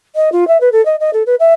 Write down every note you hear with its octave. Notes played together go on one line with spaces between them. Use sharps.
D#5
F4
E5
B4
A4
D#5
D#5
A4
B4
E5